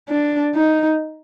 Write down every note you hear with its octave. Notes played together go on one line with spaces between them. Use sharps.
D4
D#4